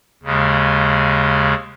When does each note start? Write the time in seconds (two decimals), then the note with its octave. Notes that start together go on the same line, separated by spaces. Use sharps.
0.23 D#2 C#3 G#3